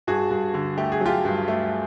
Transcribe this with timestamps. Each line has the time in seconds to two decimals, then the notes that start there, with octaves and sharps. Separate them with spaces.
0.07 G2 F#4 G#4
0.30 G2
0.54 D3
0.77 A3 G4
0.92 G#4
1.01 F#3 F4 G4
1.25 G2
1.48 A3